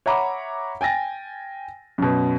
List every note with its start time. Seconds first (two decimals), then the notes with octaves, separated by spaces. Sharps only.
0.06 C#5 E5 F#5 A#5 B5 D6
0.81 G5 G#5 A6 A#6
1.98 F#2 B2